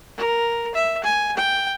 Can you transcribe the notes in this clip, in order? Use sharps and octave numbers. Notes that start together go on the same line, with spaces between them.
A#4
E5
G#5
G5